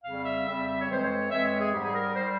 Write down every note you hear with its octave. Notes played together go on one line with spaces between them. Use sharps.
F2 C#3 G3 F5
E5
F2 C#3 G3 E5
E5
C#5
F2 E3 G#3 C5
C#5
F2 E3 G#3 E5
C#5
G#4
G#2 G3 G4
G#4
A#4
G3 C5